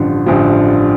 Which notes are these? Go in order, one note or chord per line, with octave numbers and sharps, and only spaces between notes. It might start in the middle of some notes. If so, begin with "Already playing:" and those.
Already playing: A1 G2 D3 F3
A1 G2 D3 F3